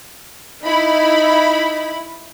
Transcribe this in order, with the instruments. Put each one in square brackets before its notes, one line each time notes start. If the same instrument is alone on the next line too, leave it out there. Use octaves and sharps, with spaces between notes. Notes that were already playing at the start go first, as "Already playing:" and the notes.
[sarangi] D#4 [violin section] E4 B5